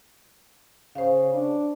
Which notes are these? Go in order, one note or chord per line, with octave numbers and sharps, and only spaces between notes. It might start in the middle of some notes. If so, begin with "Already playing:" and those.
C#3 C5 F5
D4